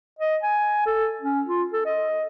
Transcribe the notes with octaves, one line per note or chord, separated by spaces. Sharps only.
D#5
G#5
A4
C#4
F4
A4
D#5